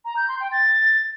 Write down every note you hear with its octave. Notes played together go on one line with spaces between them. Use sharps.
A#5
G6
C6
G5
A6